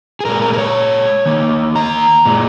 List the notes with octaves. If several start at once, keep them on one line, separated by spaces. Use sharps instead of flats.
G#4
A#2 G#3 A#4
A#4
A#4
C#5
D#3 A#3
A#5
A#2 G#3